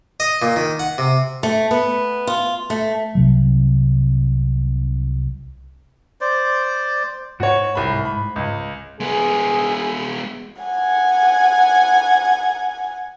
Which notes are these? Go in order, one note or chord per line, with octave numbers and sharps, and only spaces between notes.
D#5
A#2
D#3
F#5
C3
A3
B3
F4
A3
C2 C3 F#3
C5 D5
G#2 F#4 C#5
C2 B5
B5
C#2
G#3 B3 G#4
F#5 G#5